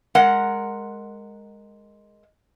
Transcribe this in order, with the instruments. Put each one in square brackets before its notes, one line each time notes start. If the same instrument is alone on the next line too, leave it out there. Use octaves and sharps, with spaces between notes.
[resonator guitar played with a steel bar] G#3 A#4 F#5